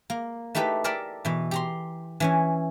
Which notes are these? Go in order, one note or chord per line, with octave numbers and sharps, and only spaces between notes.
A#3
A3 D#4 E4 G4 A4 B4
G4 A4 A#4 D5 E5 A5
B2 E3
G4 A#5 C6
E3 C#4 G#5